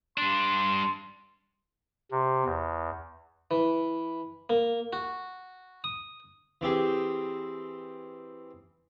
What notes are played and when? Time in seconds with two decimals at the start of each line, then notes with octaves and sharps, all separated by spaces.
0.18 G2 D4 C6
2.11 C3
2.45 E2
3.51 E3
4.50 A#3
4.93 F#4
5.84 D#6
6.61 E3 C4 G4 G#4